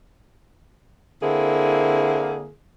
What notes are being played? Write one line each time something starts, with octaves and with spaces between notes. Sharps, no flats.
D3 A#3 C4 E4 G#4